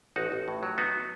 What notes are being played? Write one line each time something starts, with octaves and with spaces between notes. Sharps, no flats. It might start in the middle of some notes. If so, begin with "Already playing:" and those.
A1 D#4 F#4
A1
A2
F#3
B3 D#4 F#4